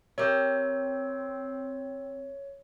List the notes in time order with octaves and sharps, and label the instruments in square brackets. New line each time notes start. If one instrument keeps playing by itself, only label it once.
[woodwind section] C4 [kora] G4 A#4 E5 [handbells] C#5